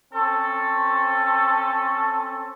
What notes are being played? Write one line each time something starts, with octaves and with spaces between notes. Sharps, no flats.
C4 C#4 A4